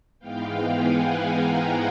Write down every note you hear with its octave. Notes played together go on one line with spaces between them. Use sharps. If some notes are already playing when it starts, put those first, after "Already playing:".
G#2 E3 G#3 B3 F5 G5
F#5 G#5
G#5 A#5